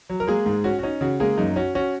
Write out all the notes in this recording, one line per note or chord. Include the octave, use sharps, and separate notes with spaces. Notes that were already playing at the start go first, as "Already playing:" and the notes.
F#3
A#4
G#3 A#3 G#4
G#2
C#4 F#4
F#4
C#4 D#4
C#3 F#4
G#3 A#3 G#4
F#2 D#4
C#4 F#4
C#4 F#4